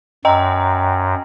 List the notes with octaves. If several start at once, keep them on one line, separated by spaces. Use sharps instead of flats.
F#2 D#5 G5 A#5